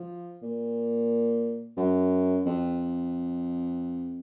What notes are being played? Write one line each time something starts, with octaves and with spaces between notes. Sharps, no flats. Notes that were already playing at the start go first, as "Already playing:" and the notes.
Already playing: F3
A#2
F#2
F2